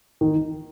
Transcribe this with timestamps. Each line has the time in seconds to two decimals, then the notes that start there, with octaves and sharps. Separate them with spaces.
0.21 D#3